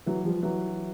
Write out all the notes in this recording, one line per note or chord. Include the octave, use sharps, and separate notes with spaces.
E3 F#3
F3 G3
E3 F#3